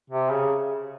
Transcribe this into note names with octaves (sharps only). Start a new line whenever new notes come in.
C3
C#3